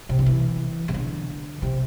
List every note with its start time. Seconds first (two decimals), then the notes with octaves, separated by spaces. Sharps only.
0.09 C3
0.19 D3
0.26 E3
0.88 C3
0.94 D3
1.62 C3